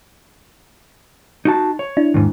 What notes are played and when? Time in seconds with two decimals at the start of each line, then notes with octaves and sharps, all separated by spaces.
1.45 D#4 F#4 A5
1.79 C#5
1.97 D4 E4
2.14 D#2 G#2